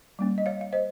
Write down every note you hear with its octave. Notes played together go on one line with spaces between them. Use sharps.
G3 A#3 C#4
D#5
C#5 F5
F5
C5 D#5